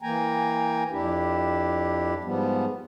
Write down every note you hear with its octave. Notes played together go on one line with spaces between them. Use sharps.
E3 A#3 G5 G#5 A#5
F2 D4 E4 G4
G#2 F3 G3 B3